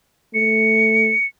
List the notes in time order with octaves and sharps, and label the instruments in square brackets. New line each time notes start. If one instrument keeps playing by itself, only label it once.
[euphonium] A3 [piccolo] C#7